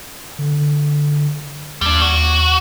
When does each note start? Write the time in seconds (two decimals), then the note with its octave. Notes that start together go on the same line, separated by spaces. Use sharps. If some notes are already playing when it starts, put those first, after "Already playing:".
0.39 D3
1.81 D#2 G3 D4
2.02 F#4